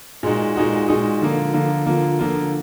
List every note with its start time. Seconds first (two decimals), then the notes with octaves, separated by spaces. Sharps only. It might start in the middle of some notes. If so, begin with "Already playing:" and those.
0.23 A#2 G#3 D#4 F#4
0.56 A#2 G#3 D#4 F#4
0.88 A#2 G#3 D#4 F#4
1.21 D3 F3 A#3 F4
1.53 D3 F3 A#3 F4
1.86 D3 F3 A#3 F4
2.19 D3 F3 A#3 F4